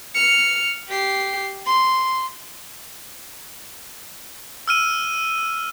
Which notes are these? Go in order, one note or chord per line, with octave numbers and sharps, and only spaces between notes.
F6 C#7
G4 C7
C6
E6 F6 D#7